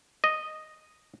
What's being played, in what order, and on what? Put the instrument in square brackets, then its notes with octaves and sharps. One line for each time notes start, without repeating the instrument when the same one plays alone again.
[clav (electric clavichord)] D#5